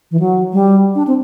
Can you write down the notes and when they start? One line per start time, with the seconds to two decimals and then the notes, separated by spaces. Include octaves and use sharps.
0.11 E3
0.19 F#3
0.53 G3
0.95 D4
1.07 C4